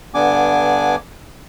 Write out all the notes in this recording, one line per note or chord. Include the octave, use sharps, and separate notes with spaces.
G2 D3 B3 D4 G#5 D6